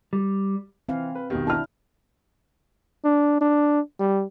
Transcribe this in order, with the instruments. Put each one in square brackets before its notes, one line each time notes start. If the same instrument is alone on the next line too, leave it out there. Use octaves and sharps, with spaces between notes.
[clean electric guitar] G3
[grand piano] E3 [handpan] C4 F5
[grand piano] B4
[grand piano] B1 B2 D#3 [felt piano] G4
[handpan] D4 E4 [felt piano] A5 F6
[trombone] D4
D4
G3